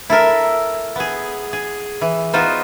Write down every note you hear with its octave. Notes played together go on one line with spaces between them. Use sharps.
E4 A4 A#4 E5
B3 G#4
G#4
E3
B3 D#4 F4 F#4 C5